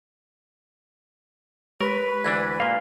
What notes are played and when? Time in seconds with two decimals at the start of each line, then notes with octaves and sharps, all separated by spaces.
1.81 G#3 G4 A#4 B4 C#6
2.24 D2 E3 D4 G#6 A#6
2.60 A#2 A#3 F5